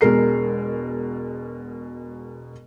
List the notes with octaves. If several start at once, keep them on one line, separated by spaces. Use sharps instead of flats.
E1 B2 G#3 A#4 C7